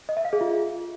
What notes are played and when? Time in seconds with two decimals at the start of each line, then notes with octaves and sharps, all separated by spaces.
0.09 D#5
0.17 E5
0.25 F5
0.33 G#4
0.41 F4